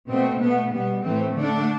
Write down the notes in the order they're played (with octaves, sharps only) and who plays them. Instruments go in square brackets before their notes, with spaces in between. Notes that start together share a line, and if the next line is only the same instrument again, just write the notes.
[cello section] B2 A3 C4
B2 A3 B3
B2 G3 B3
A2 E3 A3 C4
D3 A3 D4